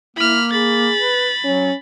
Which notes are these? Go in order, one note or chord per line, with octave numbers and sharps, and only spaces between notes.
A#3 E4 B5 F6
G#4 B5 A6
B4
F#3 C#4